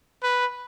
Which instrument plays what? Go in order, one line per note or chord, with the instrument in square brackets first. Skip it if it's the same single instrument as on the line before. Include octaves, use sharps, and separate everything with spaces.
[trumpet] B4